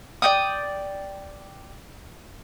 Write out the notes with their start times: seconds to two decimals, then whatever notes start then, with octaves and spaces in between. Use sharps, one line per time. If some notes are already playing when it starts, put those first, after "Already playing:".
0.22 D5 G5 D#6